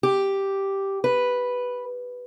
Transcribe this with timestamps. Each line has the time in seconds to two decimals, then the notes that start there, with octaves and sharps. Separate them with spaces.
0.03 G4
1.04 B4